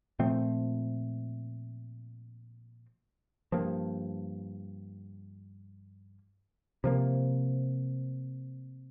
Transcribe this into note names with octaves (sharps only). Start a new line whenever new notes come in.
A#2 F3 A3 C4
G2 F3 A#3
C3 F3 A#3